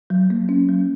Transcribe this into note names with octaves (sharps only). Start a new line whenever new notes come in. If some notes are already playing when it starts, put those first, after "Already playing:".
F#3
A#3
C#4
F#3